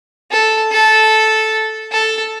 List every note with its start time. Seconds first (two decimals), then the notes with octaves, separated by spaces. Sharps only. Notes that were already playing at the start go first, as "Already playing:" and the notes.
0.31 A4
0.72 A4
1.92 A4